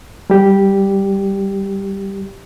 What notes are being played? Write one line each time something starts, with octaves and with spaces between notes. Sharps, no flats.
G3 G4